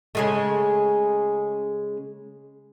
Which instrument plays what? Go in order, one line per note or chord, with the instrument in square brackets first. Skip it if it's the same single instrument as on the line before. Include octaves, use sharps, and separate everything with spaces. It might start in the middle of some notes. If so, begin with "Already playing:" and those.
[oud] C#3 G#3 A3